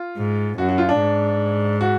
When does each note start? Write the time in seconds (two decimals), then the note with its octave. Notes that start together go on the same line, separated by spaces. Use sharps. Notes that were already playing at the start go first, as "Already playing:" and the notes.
Already playing: F4
0.17 G#2
0.58 F#2 F#4
0.69 F#4
0.78 F4
0.89 D4
0.99 G#2
1.81 F#4